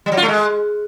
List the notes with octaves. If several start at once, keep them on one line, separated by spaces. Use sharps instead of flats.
G3
F#3
F4
A3
G#3